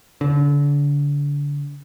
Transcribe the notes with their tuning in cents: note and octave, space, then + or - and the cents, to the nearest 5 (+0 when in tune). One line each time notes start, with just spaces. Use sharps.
D3 -30